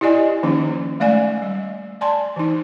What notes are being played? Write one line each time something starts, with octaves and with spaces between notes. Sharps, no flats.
E4 G4 D5 D#5 G#5
D#3 F3 A#3 C#4 D#4
G#3 A3 D5 F5 G#5
G3
D5 G#5 A5 C6
E3 D#4